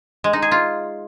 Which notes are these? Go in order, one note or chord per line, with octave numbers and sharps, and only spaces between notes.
G#3
D#4
G#4
F4